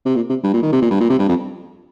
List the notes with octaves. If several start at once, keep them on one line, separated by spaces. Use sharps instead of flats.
C3
A#2
C3
G2
A#2
D#3
C3
A#2
G2
A#2
C3
G2
F2